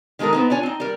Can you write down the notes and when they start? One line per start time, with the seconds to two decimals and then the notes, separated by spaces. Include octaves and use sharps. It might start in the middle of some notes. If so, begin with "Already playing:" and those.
0.19 D#3 G#3 D#4 A4 A#4
0.33 B3 C4 D#4
0.50 D4 F4 C#5 G#5
0.63 C4 D#4
0.80 G3 A#4